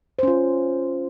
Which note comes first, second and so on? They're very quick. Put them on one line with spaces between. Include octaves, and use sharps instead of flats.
C5 C#4 F4